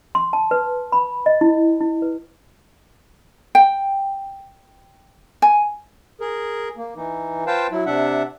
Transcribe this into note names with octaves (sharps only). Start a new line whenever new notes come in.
C6
A5
B4
B5
D#5
E4
E4
B4
G5
G#5
G#4 A#4
A#3
E3 D#4
F4 B4 C5 F5 G5 A5
F#3 E4
C3 D4 E5 F#5